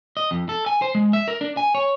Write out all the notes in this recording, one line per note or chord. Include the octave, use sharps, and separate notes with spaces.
D#5
F2
A4
G#5
C5
G#3
E5
A#4
D4
G#5
C#5